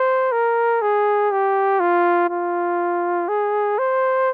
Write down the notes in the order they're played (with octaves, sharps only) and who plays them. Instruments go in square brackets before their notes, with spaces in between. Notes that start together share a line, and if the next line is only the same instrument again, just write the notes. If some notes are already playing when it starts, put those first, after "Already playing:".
Already playing: [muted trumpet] C5
A#4
G#4
G4
F4
F4
G#4
C5